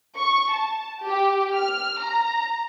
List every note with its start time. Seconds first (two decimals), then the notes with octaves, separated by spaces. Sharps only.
0.17 C#6
0.52 A5
1.04 G4
1.56 F6
2.00 A#5